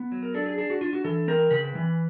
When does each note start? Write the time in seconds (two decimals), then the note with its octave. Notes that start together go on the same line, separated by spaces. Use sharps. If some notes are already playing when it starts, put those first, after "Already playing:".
Already playing: B3
0.12 F#3
0.23 A#4
0.34 D4 A4
0.46 G#4
0.58 D4 G#4
0.70 F#4
0.81 D4 F4
0.93 F#4
1.04 E3 A4
1.28 C4 A#4
1.51 C#3 B4
1.75 E3